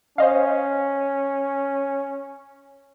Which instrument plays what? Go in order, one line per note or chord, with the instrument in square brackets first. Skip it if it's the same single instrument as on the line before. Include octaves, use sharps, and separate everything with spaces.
[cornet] C#4 [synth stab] C5 D#5 F5